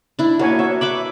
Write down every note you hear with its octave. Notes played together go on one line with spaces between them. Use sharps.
D4 E4
A#3 F#4 C#5 G#5
F#4 C#5 E5
B4 E5 B5 D6